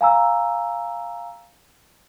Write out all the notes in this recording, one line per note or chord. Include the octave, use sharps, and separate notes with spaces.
F5 G#5 A#5 E6